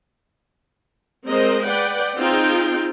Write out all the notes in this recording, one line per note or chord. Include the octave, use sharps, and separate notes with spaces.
G#3 C4 A#4 C5 D#5
B4 D5 F#5 G5
C4 D#4 F4 G#4 G5